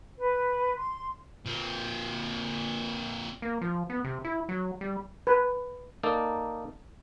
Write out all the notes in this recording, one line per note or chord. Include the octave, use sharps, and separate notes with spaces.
B4
C6
A#2 C4
A#3
F3
B3
C3
E4
F#3
G3
B4
A#3 D#4 A4 D5